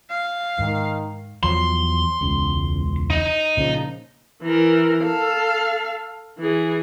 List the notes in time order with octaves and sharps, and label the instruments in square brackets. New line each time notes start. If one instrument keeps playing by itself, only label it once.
[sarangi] F5
[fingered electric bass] G#2 [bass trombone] D#3
[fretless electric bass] E2 F3 F#3 [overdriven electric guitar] C6
[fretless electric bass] E1 C#2
[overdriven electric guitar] D#4
[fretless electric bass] A#2 C#3 F3
[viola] E3 A#4
A4 F5
E3 G#4